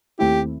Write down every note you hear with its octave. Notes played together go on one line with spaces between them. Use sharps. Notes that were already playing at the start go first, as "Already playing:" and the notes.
D#2 D#3 A3 C4 E4 G4